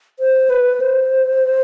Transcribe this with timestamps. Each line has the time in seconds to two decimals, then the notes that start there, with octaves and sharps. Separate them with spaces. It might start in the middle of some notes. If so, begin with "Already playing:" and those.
0.19 C5
0.50 B4
0.80 C5